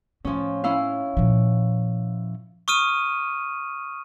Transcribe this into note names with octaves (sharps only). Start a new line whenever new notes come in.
A2 F3 C#4
C#4 E4 F5
A#2 F3
C#6 D#6 F6 D#7